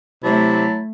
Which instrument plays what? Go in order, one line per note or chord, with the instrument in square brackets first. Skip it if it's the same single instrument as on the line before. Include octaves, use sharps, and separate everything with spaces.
[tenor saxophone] C3 [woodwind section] F#3 E4 [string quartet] A3 [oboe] A5